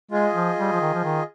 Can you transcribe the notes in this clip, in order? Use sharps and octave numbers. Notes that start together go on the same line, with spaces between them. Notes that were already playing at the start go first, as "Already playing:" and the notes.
G#3 F4 G#4 D#5
F3
G3
F3
D#3
F3
D#3